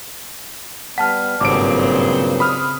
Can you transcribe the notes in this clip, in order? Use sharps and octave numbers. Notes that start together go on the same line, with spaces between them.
G3 B3 F#5 A5 F6 B6
G#1 G2 A#2 C#3 F#3 C4 D6 D7
B5 D#6 F6